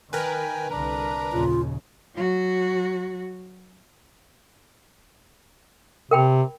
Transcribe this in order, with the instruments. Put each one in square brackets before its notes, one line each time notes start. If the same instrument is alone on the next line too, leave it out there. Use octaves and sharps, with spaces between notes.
[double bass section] D#3 [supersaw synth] A#4 B4 [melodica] G5 G#5
[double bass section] C2 D3 [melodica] D4 A#5
[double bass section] A#1 D#2 C#3 [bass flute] F4
[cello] F#3 F#4
[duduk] C3 [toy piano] A#4 G5 B5